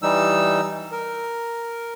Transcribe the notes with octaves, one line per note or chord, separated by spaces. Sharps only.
E3 G3 D#4 E6
A#4